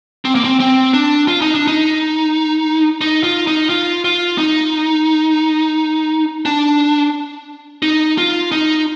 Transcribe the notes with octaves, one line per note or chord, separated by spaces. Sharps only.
C4
A#3
C4
C4
D4
F4
D#4
D4
D#4
D#4
F4
D#4
F4
F4
D#4
D4
D#4
F4
D#4